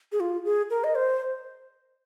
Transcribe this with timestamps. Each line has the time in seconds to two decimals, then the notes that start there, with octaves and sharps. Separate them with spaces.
0.12 G#4
0.20 F4
0.45 G#4
0.70 A#4
0.84 D#5
0.95 C5